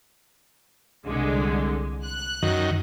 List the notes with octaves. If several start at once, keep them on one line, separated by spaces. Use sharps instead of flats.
C2 D3 G#3
F#6
F#2 D#3